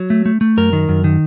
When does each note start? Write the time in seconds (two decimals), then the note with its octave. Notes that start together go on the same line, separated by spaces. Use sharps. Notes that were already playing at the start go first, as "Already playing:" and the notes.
Already playing: F#3
0.10 A3
0.26 A3
0.41 A3
0.57 F#2 A#4
0.73 D#3
0.89 F#2
1.04 D#3